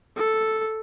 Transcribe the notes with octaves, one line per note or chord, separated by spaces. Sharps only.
A4